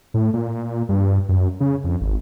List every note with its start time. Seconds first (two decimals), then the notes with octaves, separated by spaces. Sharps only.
0.14 A2
0.33 A#2
0.89 G2
1.29 F#2
1.60 C#3
1.84 F2
2.01 G#1